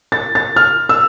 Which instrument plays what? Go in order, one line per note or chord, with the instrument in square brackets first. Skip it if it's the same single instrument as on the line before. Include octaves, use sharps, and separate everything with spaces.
[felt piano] A6
A6
F6
E6